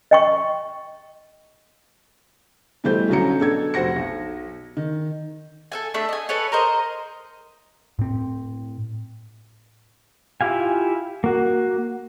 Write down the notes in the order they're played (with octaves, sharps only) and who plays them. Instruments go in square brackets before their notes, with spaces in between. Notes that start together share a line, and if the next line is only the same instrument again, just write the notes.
[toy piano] D#5 G5 C#6
[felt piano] B2 E3 G3 A3 C5 G6
B1 D3 F#3 C#4 A#5 C#7
B2 D4 A4 G#6
F1 F#4 C5 F#5 A#6 C#7
B1
D#3
[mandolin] A4 E5 G#5
A3 D4 E5
D#5 G#5
A4 B4 C#5 G#5
A#4 C5 D#5
[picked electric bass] A2 C4
[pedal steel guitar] E4 F4 G4 F5 G#5
A#3 F#4